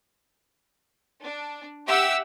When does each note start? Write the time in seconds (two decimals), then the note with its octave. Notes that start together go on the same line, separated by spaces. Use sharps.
1.23 D4
1.87 G4 E5 F#5 E6